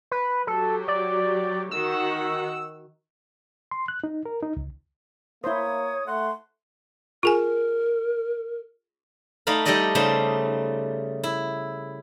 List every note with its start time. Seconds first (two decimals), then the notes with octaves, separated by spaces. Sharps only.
0.11 B4
0.47 F#3 G4 A4
0.88 D5
1.71 D#3 F#4 F#5 E6
3.71 C6
3.88 F#6
4.04 D#4
4.26 A#4
4.43 D#4
4.57 C#2
5.44 A#3 E4 C5 C#5 D#6
6.07 A3 F#5 C6
7.23 F4 G#4 A#4 G#5
9.47 A3 D#4 D5 F5 B5
9.65 G3 D#4 G4 A4 D5 D#5
9.95 C#3 G3 A3 D#4 C5
11.24 E4